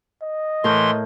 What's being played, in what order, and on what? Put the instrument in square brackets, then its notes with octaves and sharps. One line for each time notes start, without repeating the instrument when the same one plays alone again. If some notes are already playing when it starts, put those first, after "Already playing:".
[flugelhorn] D#5
[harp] A2 A#4 G6 [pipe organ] E3 C6